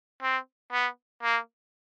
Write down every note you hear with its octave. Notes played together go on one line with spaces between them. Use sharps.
C4
B3
A#3